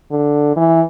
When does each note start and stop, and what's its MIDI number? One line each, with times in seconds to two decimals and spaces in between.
0.11 0.52 50
0.56 0.82 52